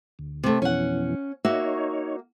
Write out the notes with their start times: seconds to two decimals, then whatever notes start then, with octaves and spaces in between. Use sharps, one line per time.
0.19 D2
0.43 C3 A3
0.62 F2 B2 E3 C#4 F#5
1.45 A#3 D#4 F#4 C#5 E5